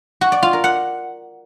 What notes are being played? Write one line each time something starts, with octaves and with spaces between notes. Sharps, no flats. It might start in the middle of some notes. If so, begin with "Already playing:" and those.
F#4
D5
F4
A#4
F#5